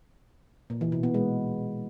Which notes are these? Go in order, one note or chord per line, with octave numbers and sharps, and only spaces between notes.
A#2
E3
B2
B3
G#3